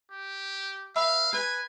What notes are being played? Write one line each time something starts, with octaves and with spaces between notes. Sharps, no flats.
G4
B4 E5 F5 B5
B4 G#5